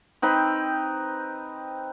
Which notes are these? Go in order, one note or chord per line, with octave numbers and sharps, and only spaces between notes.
C4 D#4 B4 G5